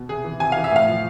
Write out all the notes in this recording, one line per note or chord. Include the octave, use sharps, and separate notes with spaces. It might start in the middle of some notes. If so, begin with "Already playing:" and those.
Already playing: B2
C3 G#4
E3
C3 G#5
E3 F5
E5
A2 F5
F3